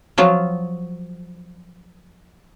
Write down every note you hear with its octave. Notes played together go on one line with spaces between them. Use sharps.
F3 F#3 F4